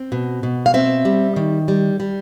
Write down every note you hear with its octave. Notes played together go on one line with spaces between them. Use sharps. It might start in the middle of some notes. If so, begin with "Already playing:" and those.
Already playing: C4
B2
B2
F5
C4 E5
G3
D#3
G3
G3